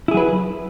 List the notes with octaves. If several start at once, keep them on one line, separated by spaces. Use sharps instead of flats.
F#3 E4 G#4 B4